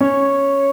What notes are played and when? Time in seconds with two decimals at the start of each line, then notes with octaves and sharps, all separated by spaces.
0.01 C#4 C#5